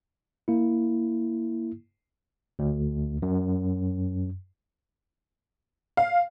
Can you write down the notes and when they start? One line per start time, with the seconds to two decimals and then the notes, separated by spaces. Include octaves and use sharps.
0.48 A#3 E4
2.59 D2
3.22 F#2
5.97 F5